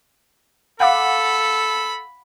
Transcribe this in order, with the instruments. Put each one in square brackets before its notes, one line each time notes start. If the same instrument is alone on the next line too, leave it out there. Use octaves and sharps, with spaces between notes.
[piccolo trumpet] A4 [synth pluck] F5 F#5 D6 [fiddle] B5